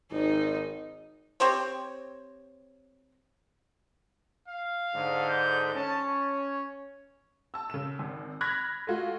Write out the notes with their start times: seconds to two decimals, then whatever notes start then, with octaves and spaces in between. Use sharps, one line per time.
0.12 G#1 D#4
1.40 C4 G4 C5 C#5
4.48 F5
4.94 G#2 D3
5.29 G6
5.75 C#4 A5
6.06 C#5
7.54 A5 E6
7.70 C#3 E7
7.99 G#1
8.41 B5 F6 F#6 G#6 A#6 B6
8.87 G#3 A3 F4 F#4